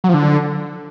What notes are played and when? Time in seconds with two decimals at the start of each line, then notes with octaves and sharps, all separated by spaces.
0.04 F#3
0.09 F3
0.14 D3